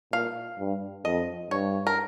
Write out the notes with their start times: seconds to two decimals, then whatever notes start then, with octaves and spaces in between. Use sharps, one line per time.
0.13 A#2 F5
0.59 G2
1.05 F2 D#5
1.51 G2 C#5
1.87 A#4